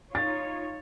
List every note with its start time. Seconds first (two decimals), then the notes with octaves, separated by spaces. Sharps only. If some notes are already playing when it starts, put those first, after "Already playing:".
0.15 D#4 F4 C#5 A6